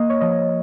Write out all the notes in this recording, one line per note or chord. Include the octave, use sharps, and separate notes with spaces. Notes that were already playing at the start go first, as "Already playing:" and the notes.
Already playing: A#3 D#5
C#5
F3 D#5